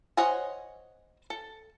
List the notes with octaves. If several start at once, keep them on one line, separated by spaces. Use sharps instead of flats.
C5 C#5 D#5 F#5 G#5
A4